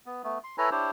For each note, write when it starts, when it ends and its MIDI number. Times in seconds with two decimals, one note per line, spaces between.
0.06 0.23 59
0.24 0.38 57
0.24 0.38 59
0.44 0.56 84
0.58 0.70 64
0.58 0.70 69
0.58 0.70 71
0.58 0.70 73
0.58 0.70 80
0.58 0.70 82
0.71 0.91 62
0.71 0.91 64
0.71 0.91 67
0.71 0.91 72
0.71 0.91 73